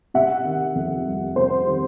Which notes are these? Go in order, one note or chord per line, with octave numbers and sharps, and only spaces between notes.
C3 E5 F#5
D#3
F2
G3
C3 C5
D#3